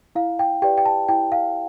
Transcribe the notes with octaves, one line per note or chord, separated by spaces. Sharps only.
E4 F5
G5
G4 B4 D5 G5
G5
A5
E4 G5
F5